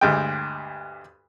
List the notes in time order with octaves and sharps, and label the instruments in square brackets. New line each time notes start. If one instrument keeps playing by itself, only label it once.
[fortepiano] D2 G2 G#3 G5